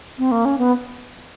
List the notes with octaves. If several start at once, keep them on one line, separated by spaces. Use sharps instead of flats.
C4
A#3
C#4
B3